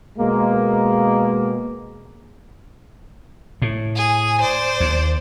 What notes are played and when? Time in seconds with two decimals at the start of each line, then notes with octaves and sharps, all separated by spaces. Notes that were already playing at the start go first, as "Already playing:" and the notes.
0.19 B2 G#3 A#3
3.62 A2
3.95 G#4
4.40 C5 D5
4.80 D#2